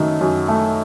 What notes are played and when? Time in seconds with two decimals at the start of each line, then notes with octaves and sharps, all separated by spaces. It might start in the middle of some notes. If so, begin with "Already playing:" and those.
Already playing: F#2 D#3 F#3 A3
0.21 F#2
0.48 A3